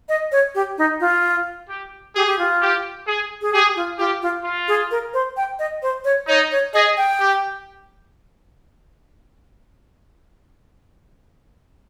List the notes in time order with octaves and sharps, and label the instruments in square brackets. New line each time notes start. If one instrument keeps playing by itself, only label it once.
[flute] D#5
C#5
G4
D#4
F4
[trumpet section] G4
[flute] G4 [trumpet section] G#4
[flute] G4
F4
[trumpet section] G4
G#4
[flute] G#4
[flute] G4 [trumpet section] G#4
[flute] F4
[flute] F4 [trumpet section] G4
[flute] F4
[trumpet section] F4
[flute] G#4
A#4
C5
G5
D#5
C5
C#5
[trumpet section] D#4 [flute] C#5
[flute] C#5
[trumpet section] G#4 [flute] D#5
[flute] G5
[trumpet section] G4